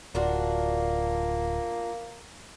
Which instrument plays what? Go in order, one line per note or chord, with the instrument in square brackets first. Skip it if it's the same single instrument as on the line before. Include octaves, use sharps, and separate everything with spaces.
[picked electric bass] D1 [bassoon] A#3 [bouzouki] D4 F4 F#4